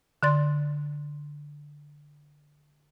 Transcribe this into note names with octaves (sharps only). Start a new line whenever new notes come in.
D3 D5 C6 A6